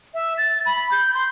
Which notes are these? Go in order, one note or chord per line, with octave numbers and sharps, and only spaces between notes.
E5
A6
B5
G6
C6